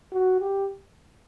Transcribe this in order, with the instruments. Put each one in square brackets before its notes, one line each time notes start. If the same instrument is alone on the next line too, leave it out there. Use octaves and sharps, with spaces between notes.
[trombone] F#4
G4